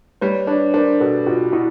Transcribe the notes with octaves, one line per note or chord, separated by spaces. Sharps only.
G3 B4 C#5
D4 B4 C#5
D4 A#4 C5
B2 A4 B4
B2 F4 G4
B2 E4 F#4